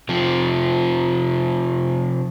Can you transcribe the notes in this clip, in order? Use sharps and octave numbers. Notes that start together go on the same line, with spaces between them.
C3 F3